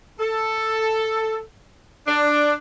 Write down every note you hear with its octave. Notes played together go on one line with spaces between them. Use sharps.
A4
D4